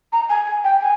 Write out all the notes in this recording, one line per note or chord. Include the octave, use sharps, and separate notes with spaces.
A#5
G#5
G#5
G5
G#5